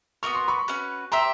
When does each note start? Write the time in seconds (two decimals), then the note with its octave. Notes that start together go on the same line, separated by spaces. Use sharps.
0.23 B3 D4 F#4 A#4 C#6
0.35 C6
0.48 B5 C#6
0.68 C#4 F#4 B4
1.12 G4 C5 E5 A#5 C6